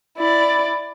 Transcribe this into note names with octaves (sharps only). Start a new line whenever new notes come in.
E4 D5